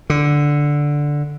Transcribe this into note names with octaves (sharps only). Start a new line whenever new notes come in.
D3